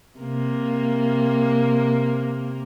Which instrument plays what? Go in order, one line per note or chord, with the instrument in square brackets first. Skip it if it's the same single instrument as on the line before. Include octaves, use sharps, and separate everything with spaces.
[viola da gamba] C3 A#3